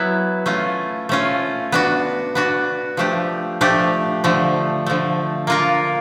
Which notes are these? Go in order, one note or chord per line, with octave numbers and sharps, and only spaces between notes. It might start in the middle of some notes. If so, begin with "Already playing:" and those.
Already playing: F#3 B3 E4
A3 C#4 F4
A3 C#4 F4
B3 D4 F#4
B3 D4 F#4
F3 A3 D4 G4
F3 A3 D4 G4
D3 F3 A3
D3 F3 A3
A#3 D4 F4 A#4